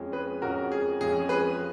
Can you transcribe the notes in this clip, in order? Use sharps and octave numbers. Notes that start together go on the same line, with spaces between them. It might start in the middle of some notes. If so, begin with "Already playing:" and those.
Already playing: F2 F3 G#3 C#4
G#4 B4
F2 F3 G#3 C#4 F#4 A#4
G#4
F2 F3 G#3 C#4 G#4
G#4 B4